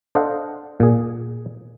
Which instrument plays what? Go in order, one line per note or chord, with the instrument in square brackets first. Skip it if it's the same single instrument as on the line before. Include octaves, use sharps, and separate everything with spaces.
[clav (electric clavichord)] D4 A4 C5 D#5 F5 F#5
A#2 G#4